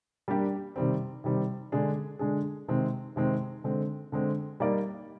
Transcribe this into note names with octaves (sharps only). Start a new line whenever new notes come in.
G3 A#3 D4 G4
C3 D#3 G3 C4
C3 D#3 G3 C4
D3 G#3 D4 G#4
D3 G#3 D4 G#4
C3 D#3 G#3 C4
C3 D#3 G#3 C4
D3 G#3 C4
D3 G#3 C4
G3 A#3 D#4 A#4 D5